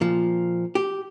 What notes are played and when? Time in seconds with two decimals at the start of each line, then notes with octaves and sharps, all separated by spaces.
0.01 A#2 F3
0.75 G4